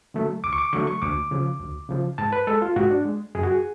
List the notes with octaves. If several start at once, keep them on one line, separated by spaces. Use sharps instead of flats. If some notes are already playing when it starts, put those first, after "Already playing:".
D3 F#3 A3
D2 D6
C#6
D6
D3 F#3 A3 C#6
C#6
D2 D6
C#3 F3
D2
C#3 F3
G#2 A5
B4
G#3 A4
F4
G#2 F#4
D4
G#3
F#2 G#4
F#4
G#4